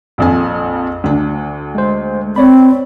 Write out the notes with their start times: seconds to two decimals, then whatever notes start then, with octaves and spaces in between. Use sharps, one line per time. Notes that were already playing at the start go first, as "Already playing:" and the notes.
0.18 A#1 F2 G#5
1.04 D2 D4
1.75 G#3 C5
2.36 C4 C#5 D5 B5